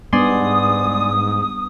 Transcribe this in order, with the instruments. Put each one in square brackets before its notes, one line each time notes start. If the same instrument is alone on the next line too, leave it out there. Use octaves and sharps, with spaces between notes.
[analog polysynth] G#2 [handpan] G3 B3 D4 [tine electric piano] D5 G#5 C6 [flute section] D#6